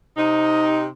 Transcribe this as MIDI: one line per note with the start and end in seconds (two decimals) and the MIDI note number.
0.17 0.86 48
0.17 0.86 63